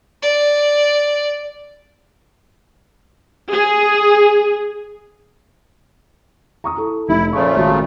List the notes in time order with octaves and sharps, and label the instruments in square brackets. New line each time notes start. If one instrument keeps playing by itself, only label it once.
[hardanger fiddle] D5
[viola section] G#4
[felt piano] A#5 C#6 D#6
E4 A4
[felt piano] F1 D#4 [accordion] E4
[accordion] A#2 C#3 A3 [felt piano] C5 C#6
[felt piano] G#1 F#4